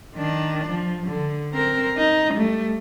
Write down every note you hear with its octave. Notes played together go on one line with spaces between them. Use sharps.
D#3 D4
F3
D3
C4 A#4
D#4
G3 A3